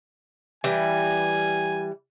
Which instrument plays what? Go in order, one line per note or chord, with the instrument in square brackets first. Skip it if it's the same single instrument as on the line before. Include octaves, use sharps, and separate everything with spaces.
[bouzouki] E3 G3 [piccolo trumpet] G#5